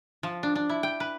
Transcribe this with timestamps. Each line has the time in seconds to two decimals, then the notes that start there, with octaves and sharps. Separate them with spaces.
0.23 F3
0.43 D4
0.55 D4
0.69 E4
0.83 G5
1.00 B4